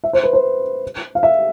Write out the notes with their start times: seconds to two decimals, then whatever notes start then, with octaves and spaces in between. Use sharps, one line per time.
0.04 E5
0.13 C5
0.23 B4
0.33 C5
1.15 F5
1.23 E5